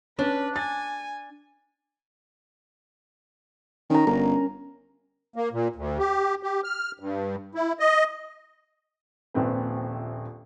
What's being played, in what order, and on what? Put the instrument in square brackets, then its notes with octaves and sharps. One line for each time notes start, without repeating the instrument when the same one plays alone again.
[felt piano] C#4 [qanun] D4 [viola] B4
[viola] G#5 [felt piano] A6
[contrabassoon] D#3 [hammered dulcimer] C#4 A#5
[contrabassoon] G1 [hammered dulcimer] A#4
[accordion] A#3
A#2
D2
G4
G4
F6
G2
E4
D#5
[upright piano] D#1 A#1 C4 B4